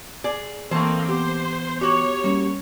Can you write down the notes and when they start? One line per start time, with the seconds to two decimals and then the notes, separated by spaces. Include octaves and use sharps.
0.24 G#4 D5
0.71 E3 A3 A#3 C4 D#4 C5 A5
1.09 B3 G4 C5
1.81 F#4 G4 C#5
2.24 G3 A#3 C#4